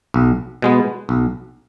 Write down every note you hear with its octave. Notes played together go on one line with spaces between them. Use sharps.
B1
B2 G#3 B3
B1